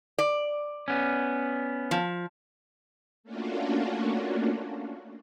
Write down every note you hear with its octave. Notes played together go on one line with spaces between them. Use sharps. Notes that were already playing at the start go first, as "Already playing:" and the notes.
D5
B3 C#4
F3
A3 A#3 C#4 D4 F4 F#4